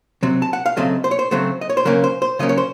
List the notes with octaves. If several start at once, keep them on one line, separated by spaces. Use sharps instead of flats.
C3 F#3 C4
A5
F#5
F5
C#3 F#3 A3 C4 D#5
C5
C#5
C5
C#3 F#3 A3 C4 C5
D#5
C#5
C5
C#3 F#3 A#3 C#4 A#4
C5
C5
C#3 F#3 A#3 C#4 D#5
C#5
C5